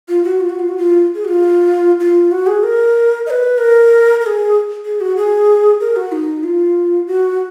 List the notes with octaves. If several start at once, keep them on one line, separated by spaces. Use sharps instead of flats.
F4
F#4
F4
F#4
F4
F#4
F4
G#4
F#4
F4
F4
F#4
G#4
A#4
D#5
B4
A#4
A#4
G#4
G#4
F#4
G#4
A#4
F#4
D#4
F4
F#4